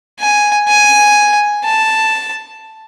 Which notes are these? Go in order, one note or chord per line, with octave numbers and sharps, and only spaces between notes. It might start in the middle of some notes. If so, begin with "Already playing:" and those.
G#5
G#5
A5